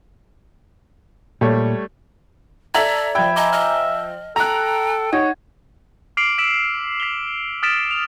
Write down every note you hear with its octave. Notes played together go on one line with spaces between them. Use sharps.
A#2 G3 A3 C#5
A4 D5 E5 A#5 G#6
F3 E5 G5 B5 E6 G#6
D#5 G#5 A#5 D6
D#5 F6
A4 G5 A#5 F#6
D#4 C#5 F#5 G#6
D6 F6 C7 D7 F7 F#7
E6 B6 D7 E7 F#7
B6 F7 G7
D#6 F6 A6 B6 D7 E7
F7